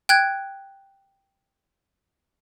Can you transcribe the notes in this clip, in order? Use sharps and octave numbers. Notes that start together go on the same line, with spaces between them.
G5 F#6 G#6